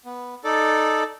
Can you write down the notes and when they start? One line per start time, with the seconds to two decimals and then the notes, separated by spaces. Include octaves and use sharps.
0.05 B3
0.44 D#4 A4 D5